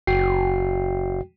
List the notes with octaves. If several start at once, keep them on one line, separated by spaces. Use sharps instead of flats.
F#1 F#4 G5 C7